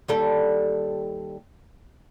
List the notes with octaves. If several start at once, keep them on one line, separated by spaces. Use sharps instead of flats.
D#2 G3 A4